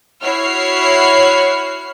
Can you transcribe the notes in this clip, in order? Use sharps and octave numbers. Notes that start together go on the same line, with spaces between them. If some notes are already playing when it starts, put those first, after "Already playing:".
E4 F#4 C#5 F6 C7